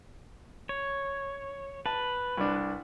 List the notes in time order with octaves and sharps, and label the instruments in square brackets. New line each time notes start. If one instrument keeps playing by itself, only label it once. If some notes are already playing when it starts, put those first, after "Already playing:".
[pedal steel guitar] C#5
[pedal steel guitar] B4 [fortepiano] A5
[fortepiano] C2 D4